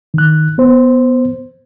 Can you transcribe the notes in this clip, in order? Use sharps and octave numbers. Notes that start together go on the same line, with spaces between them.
D#3 F#6
B3 C5